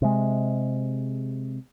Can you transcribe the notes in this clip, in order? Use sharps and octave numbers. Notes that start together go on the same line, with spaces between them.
C3 G#3